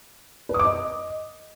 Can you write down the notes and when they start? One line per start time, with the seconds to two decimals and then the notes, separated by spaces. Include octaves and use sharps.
0.49 B4
0.54 D#6
0.59 D6
0.65 D#5